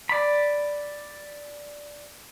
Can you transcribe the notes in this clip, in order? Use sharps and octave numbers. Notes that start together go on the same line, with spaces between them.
D5 B5